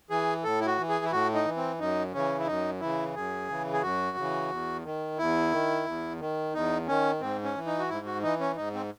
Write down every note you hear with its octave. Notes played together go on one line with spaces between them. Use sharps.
E3 G#4
A2 A4
E4
F#4
E3
G#4
E4
A2 F#4
D#4
E3
C4
F#2 D#4
C#3 E3 C#4
E4
F#2 D#4
C#3 E3 E4
F#2 G#4
C#3 E3
G#4
F#2 F#4
C#3 E3
E2
D#3
E2 E4
D#3
E2
D#3
E2 D#4
D#3 C#4
G#2 C4
C#4
E3
D#4
F#4
G#2 E4
F#4
E3 D#4
C#4
G#2 D#4
C4